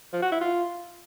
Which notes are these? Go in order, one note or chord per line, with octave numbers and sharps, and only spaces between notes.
F3
F#4
E4
F4